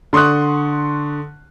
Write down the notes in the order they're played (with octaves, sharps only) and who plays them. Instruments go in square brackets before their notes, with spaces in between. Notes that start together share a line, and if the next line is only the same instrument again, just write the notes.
[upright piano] D3 C6 C#6 D#6 F#6